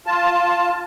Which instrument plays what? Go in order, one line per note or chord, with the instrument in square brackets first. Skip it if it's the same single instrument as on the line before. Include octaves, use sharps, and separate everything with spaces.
[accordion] F4 A5